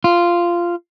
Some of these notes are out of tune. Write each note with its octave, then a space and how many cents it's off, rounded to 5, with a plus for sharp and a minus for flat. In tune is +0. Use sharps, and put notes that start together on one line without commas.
F4 -10